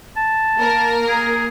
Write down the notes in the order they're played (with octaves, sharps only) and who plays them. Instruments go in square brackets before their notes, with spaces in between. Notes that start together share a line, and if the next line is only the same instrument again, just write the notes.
[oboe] A5
[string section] A#3 A#4
[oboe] G#4